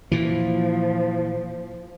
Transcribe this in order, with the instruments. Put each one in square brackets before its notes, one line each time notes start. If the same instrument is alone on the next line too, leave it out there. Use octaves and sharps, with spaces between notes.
[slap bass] A#2 E3 [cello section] F3